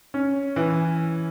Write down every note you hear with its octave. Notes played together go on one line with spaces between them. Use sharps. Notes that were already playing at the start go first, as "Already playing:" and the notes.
C#4
E3